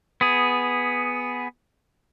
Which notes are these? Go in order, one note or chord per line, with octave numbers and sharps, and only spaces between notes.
B3 G#4